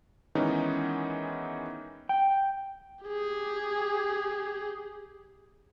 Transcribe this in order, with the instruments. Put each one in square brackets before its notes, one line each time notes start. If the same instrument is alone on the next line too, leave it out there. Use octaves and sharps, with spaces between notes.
[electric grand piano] D#3 E3 G#3 B3 C#4 D#4
[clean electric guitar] G5
[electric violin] G4 G#4